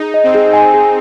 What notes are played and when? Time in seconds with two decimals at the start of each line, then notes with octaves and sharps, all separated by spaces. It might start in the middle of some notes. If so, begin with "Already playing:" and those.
Already playing: D#4 G#4
0.14 D#5
0.24 C4
0.34 G#4
0.53 C4 G#5
0.74 G#4